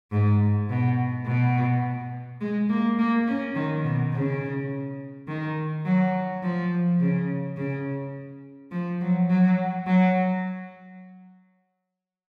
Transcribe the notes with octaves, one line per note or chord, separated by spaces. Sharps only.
G#2
B2
B2
G#3
A#3
A#3
C#4
D#3
B2
C#3
D#3
F#3
F3
C#3
C#3
F3
F#3
F#3
F#3